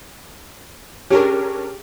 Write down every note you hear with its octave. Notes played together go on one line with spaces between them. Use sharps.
C#4 D4 G4 G#4 A#4